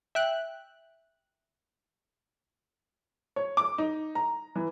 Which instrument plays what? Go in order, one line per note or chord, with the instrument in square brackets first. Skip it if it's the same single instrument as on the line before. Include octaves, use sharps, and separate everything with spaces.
[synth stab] E5 G5 F#6
[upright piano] C#5
D6
D#4
A#5
E3